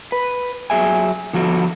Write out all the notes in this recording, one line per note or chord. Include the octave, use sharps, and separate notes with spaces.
B4
F#3 G#4 E5 G#5
D3 F3 F#4 A4